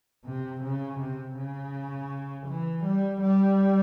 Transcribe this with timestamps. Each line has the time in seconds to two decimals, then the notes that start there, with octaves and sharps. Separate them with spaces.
0.25 C3
0.63 C#3
0.99 C3
1.36 C#3
2.47 E3
2.84 G3
3.21 G3